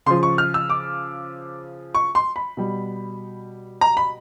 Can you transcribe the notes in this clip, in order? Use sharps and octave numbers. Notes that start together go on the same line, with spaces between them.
C#3 F3 C6
C#6
F6
E6
D6
C#6
C6
B5
B2 G3
A#5
B5